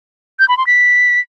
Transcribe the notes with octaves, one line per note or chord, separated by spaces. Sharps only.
G6
B5
C6
B6